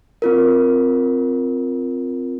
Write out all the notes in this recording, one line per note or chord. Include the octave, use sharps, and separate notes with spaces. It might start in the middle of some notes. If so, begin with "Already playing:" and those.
C4 F4 A#4